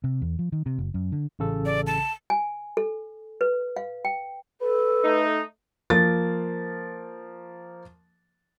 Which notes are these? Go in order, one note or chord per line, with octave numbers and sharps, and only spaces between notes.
C3
E2
F3
D#3
C3
F#1
F#2
D3
A1 C#3 A4
D5
A5
G#5
A4
B4
F5
G5
A4 B4
A3 D#4
F3 A#3 A6